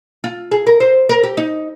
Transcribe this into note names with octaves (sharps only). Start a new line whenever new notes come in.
F4
G#4
A#4
C5
A#4
G4
D#4